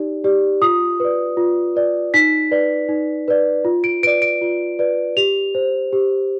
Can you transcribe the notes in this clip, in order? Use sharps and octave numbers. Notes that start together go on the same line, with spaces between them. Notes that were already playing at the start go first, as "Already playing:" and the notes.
Already playing: D#4 G4 D5
G4 D5
F4 D#6
B4 D5
F4
B4 D5
D#4 B6
B4 D5
D#4
B4 D5
F4
D7
B4 D5 D7
D7
F4
B4 D5
G4 F7
C5
G4